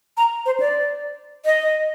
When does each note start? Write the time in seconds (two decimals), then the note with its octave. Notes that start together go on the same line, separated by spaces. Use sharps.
0.17 A#5
0.46 C5
0.60 D5
1.46 D#5